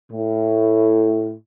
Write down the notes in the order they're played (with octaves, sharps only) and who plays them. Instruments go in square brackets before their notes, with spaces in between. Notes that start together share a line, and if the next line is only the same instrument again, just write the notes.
[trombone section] A2